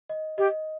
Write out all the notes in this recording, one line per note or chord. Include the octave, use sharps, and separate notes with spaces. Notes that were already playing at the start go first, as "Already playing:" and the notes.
D#5
G4 D#5